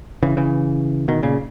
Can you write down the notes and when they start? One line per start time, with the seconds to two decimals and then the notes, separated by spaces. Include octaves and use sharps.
0.23 C#3 E3
0.37 C#3 E3
1.08 B2 D#3
1.23 A#2 C#3